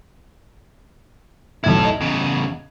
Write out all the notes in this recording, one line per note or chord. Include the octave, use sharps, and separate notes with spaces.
E1 B1 E4 A4 G#6
D#5
E2 C#3